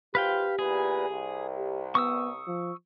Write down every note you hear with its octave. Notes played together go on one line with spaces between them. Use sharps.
G#1 C4 F4 G4 B4 F5 G5
E2 A#2 G#4 B4
C2
G4
B3 C#6 D#6 E6
F3